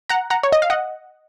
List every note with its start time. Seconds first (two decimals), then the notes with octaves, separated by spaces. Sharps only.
0.09 F#5 A#5
0.30 F#5 A#5
0.43 C#5
0.52 D#5
0.62 F5
0.70 D#5 F#5